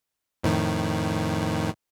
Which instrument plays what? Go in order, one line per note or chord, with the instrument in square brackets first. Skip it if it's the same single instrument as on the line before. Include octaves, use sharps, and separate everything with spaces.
[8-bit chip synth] F2 A2 D#3